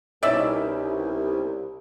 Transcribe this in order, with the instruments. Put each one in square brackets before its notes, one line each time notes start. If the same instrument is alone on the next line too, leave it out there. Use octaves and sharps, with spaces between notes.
[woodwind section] C2 [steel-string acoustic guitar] B2 C#4 D#4 [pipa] D5 E5